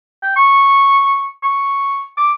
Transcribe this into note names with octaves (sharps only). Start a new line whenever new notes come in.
G5
C#6
C#6
D6